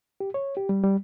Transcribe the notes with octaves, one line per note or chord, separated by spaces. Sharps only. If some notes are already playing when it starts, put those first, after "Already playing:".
G4
C#5
G4
G3
G3